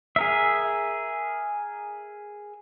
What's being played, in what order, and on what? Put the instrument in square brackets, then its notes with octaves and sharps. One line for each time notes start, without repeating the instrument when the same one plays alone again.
[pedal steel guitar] G#4 A#4 E5